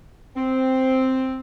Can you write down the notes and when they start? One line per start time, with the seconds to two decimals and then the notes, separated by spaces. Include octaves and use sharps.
0.37 C4